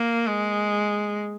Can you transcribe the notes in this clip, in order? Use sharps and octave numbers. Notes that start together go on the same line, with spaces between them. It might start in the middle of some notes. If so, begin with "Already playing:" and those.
Already playing: A#3
G#3